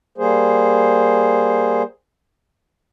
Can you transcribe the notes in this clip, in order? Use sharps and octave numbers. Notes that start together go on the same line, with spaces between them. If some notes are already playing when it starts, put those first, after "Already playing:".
G3 A#3 G#4 C5